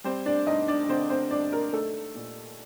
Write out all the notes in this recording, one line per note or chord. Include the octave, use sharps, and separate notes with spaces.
G3 C4 C5
D4 D5
G2 D#4 D#5
D4 D5
D3 C4 C5
C4 C5
G2 D4 D5
A#3 A#4
A3 D#4 A4
A#2